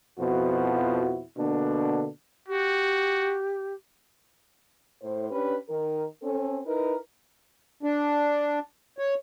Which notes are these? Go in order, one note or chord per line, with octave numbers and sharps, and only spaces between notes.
F2 B2 F3 E4 F#4
B2 D3 A#3 D4
F#4 G4
A2 C5
C#4 D4 G4 B4
D#3 A#4
C4 C#4 A4
D#4 E4 A#4 B4
D4
C#5